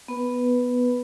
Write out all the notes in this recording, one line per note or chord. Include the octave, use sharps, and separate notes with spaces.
B3 B4